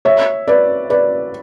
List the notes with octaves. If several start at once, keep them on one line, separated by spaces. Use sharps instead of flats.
C#5 E5
B4 D5
B4 D5